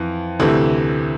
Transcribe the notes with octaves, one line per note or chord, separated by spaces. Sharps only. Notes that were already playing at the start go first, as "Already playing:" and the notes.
Already playing: F2 E3
D2 C3 E3 A3